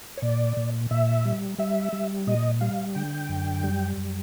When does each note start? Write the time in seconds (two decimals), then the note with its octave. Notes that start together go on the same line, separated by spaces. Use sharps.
0.17 C#5
0.22 A#2 D5
0.57 A#2
0.91 A#2 E5
1.25 G3
1.58 G3 E5
1.93 G3
2.27 A#2 D#5
2.61 G3 F5
2.95 D3 G5
3.29 F#2
3.64 G3
3.97 F#2